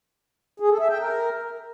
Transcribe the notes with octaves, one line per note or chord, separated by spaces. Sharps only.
G#4
A4
E5
G5
A#4